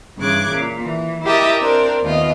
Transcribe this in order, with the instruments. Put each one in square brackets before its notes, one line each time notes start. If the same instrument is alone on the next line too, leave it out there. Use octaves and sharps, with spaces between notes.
[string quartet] G2 C#3 E3 D6 F#6 G#6
A#2
E3
E4 G4 A#4 D#5 E5 A5
C4 D4 A#4
D#2 A3 B3 F4 D#5